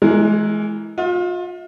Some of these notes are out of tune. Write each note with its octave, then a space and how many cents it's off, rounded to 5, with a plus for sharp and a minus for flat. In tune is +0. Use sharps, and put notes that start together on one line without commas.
E3 +0 G#3 +25 A#4 +0
F4 +30 E5 -35